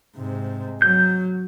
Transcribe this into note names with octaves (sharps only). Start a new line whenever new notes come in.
G#2 C3
F#3 G6